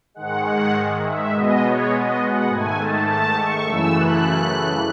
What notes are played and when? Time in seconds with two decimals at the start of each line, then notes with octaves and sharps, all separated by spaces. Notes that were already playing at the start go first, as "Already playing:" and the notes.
0.14 G#2 D#3 G#3 F#5
0.44 F#5
1.03 E5
1.31 B2 G#3 B3 D#5
1.61 C#5
1.89 D#5
2.18 F#5
2.47 G#2 D#3 A3 G#5
2.76 A5
3.06 A5
3.35 C#6
3.64 F#2 C#3 E3 A3 E6
3.93 F#6